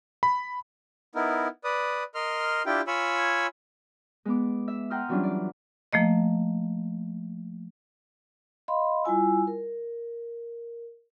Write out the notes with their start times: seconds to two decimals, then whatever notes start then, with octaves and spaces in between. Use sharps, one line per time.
0.23 B5
1.15 B3 D#4 E4 A#4
1.64 B4 D5 D#6
2.15 A#4 D#5 C6 F6
2.66 D4 E4 F4 G4 G5
2.87 F4 C#5 G#5 B5 E6
4.25 G#3 B3 D6
4.68 E5
4.90 F#5 G5 A#5 C6 D#6 F6
5.09 E3 F#3 G3 C#4 D4 F4
5.23 D5
5.93 F3 A3 A#3 D#5
8.68 D#5 F5 B5 C6
9.04 G3 E4 F4 G#5 E6
9.47 A#4